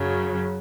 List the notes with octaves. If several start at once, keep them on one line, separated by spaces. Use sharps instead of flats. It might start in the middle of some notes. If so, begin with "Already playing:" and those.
Already playing: F#2 C#3 F#3